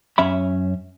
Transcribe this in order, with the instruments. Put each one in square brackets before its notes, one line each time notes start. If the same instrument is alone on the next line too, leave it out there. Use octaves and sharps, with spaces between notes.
[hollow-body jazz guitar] F#2 C#4 E5 B5